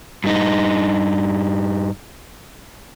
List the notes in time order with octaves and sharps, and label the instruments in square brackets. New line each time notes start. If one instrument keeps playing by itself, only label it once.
[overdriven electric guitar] G2 D#4